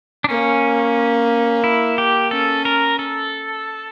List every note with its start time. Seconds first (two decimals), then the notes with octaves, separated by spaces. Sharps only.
0.24 D4
0.29 A#3 C#4
1.64 E4
1.98 G4
2.31 C#4 A4
2.65 A#4
2.99 A4